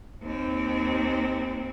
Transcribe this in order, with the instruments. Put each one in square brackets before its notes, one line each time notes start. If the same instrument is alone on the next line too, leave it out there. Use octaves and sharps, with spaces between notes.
[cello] D#2 C4